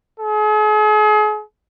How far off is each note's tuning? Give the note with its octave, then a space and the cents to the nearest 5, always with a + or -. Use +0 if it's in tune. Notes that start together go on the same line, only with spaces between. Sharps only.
G#4 +40